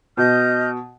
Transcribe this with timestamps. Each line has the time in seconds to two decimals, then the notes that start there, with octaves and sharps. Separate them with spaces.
0.17 B2 D#5 F6 G6